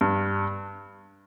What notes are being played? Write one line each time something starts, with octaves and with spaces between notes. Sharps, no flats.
G2